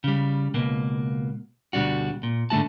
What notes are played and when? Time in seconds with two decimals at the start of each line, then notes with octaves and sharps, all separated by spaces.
0.04 C#3 G3
0.54 C#2 B2 A#3
1.73 D2 B2 G3 D4 F#4
2.23 A#2
2.50 G#2 D3 A3 F#4 A5